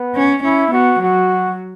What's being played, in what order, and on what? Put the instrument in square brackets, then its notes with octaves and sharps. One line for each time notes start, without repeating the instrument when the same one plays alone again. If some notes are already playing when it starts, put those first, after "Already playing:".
Already playing: [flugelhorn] B3
[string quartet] C#4
[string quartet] C#4 [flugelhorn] E4
[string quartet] B3 [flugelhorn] F#4
[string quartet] F#3 [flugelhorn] F#4